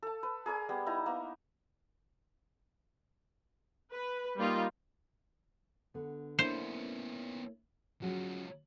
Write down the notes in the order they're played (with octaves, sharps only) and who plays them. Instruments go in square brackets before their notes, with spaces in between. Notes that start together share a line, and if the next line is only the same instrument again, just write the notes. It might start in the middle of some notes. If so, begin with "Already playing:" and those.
[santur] A4 A5
B4
G#4 A#4 D5 G#5
G3 B3
D#4 E4 G#5 A#5
A#3 B3
[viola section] B4
G3 A#3 D#4 F4
[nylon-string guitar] D3 B3
[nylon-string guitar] A#3 D4 E4 [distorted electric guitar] B3 C#4 [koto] C5
[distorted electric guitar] F3 C#4 [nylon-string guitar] F#3 G#3